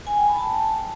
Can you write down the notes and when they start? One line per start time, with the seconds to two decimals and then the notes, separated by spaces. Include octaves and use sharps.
0.07 G#5
0.17 G5
0.28 B5
0.38 A5